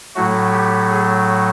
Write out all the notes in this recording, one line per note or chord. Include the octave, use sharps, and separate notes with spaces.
A2 F#3 A3 F#4
G4
G#4